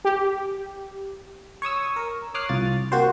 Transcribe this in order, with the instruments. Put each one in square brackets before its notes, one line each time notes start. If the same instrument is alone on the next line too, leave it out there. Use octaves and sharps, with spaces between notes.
[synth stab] G4
[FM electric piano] C#5 C#6 D#6 E6
A#4
C#5 D6 D#6 F6 F#6 C7
C2 F4 A6
A#3 F#4 G4 C5